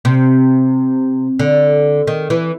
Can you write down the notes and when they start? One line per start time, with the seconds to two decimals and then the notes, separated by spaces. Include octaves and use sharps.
0.05 C3
1.39 D3
2.07 D#3
2.30 E3